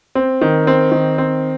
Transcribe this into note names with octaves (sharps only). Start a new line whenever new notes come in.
C4
D#3
C4
D#3
C4